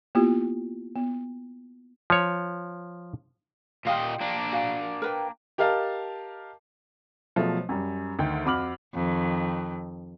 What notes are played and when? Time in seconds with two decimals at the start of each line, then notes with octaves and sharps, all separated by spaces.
0.15 A#3 B3 E4 F4 G4
0.96 B3
2.10 F3 C#5
3.87 A#2 F4 G4 D#5 F5
4.21 A#3 D4
4.52 F#4 F5 G#5
5.02 A#4 B4 G5
5.58 G4 A#4 D#5 F5 A5
7.36 B2 F3 F#3 A3 G#4 A4
7.69 F#2 G3
8.19 D2 D#3 G5
8.45 F2 F#4 B5 D6 F6 F#7
8.94 F2 D#3